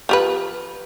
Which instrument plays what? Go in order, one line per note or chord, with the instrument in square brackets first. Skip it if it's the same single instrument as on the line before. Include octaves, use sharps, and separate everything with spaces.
[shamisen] F3 G4 B4